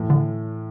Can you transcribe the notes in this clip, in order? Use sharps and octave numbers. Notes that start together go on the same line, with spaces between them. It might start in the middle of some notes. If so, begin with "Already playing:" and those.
Already playing: A2 E3 A3
D3